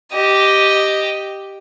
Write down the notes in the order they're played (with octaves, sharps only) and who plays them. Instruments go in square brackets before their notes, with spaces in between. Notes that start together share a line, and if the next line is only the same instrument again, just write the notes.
[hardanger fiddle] G4 D#5